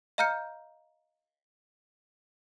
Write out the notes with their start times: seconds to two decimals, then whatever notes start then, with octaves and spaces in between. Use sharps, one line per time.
0.18 D#5 F5 A#5 F6 G6 C#7